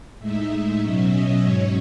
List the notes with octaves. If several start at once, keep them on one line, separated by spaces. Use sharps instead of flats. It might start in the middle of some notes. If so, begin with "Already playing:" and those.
A2 G#3 D#4 E5
B2 F#3 C#4
D#5
G#2 F#3 C#4 C#5